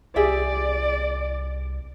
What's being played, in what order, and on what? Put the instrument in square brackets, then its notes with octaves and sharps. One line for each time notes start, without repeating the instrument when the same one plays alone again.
[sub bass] C2 [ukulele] G4 G#4 E5 [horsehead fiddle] D5